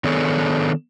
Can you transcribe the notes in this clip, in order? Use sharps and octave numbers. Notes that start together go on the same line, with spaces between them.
D#3 B3 D4 G#4 A4 C#5